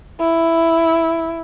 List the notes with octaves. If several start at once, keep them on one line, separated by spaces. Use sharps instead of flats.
E4